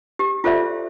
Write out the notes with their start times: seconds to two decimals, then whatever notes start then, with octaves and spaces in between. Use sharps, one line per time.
0.19 G4
0.44 F4 A4 C5 D5 E5